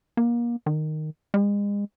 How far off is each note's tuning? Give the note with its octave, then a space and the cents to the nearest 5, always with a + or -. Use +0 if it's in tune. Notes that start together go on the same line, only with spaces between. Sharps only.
A#3 +30
D#3 -10
G#3 -35